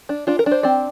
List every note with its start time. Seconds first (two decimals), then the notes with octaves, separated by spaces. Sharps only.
0.09 D4
0.27 D4 F4
0.39 A#4
0.46 D4
0.52 C5
0.63 C4 D5